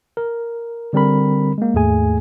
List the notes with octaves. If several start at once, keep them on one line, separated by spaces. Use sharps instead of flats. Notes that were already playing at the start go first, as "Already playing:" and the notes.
A#4
D3 G3 C4 A#4 B5
G#3 A#3
D#2 G#2 A3 G#4 G#5